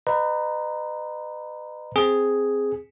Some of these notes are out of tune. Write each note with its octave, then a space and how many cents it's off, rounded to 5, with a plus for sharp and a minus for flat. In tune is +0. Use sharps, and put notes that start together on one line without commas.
B4 +25 D#5 -35 A#5 +0
C4 +0 G#4 +0